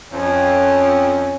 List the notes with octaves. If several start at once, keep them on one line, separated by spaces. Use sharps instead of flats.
F2 C#4